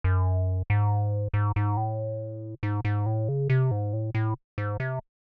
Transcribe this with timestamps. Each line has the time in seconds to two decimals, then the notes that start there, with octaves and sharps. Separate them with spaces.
0.04 F#2
0.70 G#2
1.34 G#2
1.56 G#2
1.77 A2
2.63 G#2
2.85 G#2
3.06 A2
3.28 C#3
3.49 C3
3.71 G#2
3.93 A2
4.15 A2
4.58 G#2
4.80 C3